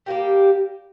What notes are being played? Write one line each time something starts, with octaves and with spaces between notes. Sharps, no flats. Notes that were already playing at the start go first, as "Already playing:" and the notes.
G3 A#3 G4